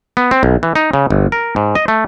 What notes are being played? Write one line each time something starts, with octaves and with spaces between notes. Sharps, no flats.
B3
C4
B1
E3
D#4
C#3
G1
A#4
G#2
D#5
A3